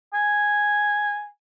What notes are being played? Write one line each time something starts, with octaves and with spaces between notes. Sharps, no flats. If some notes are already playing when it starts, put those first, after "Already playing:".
G#5